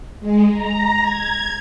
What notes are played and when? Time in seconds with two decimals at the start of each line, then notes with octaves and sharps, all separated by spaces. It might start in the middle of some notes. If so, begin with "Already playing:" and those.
0.20 G#3
0.50 A#5
1.02 G#6